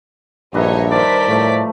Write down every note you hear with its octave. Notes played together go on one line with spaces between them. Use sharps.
A#1 G2 D#4 B4 C#5 E5
D#3 A#4 C5 D5 A5 B6
A2 F3 A3